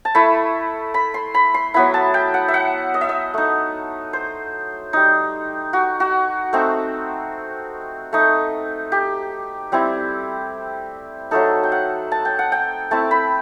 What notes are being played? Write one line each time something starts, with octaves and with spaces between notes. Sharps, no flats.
A5
A3 E4 B5
B5
C6
B5
C6
F#3 B3 E4 B5
A5
G5
F#5
E5
F#5
D#5
E5
D#5
A3 D#4
C5
G3 D#4
F#4
F#4
A3 C4 D#4
A3 D#4
G4
G3 C4 E4
F#3 A3 D#4 A4
G5
F#5
A5
G5
F#5
G5
A3 C4 E4 A5
B5